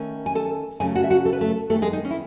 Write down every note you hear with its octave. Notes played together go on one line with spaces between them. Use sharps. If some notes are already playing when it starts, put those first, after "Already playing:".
Already playing: D#3 A3 C#4
G#5
A4 A5
C#3 F#3 A3 C#4 G#4 G#5
F#4 F#5
E5
F#4 F#5
A4
B4
A3 A4
D#3 G#3 A3 B3 A4
G#3 G#4
D#4
C#4
E4